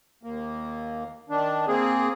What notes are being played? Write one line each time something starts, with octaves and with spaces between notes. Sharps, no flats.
D#2 A#3
D#3 D4
A#3 C4 G#4